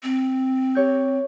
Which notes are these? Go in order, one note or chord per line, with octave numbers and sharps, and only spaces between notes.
C4
G4 C#5 G6